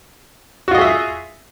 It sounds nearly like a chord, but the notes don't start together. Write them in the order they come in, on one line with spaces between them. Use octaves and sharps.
F#4 F4 D#5 G#4 E5